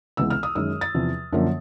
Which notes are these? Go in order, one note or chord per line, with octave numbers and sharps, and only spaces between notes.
C#2 C3 E3 G#3 B3 E6
F6
D#6
F#2 D#3 G#3 E6
A6
E2 C3 F3
F#2 D3 F3 A#3